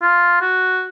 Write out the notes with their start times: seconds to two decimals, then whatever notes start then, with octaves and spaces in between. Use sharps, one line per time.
0.02 F4
0.41 F#4